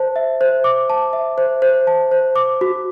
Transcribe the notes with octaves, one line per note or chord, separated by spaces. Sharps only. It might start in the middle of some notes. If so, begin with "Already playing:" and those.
Already playing: C5 A5
E5
C5
D6
A5
E5
C5
C5
A5
C5
D6
F#4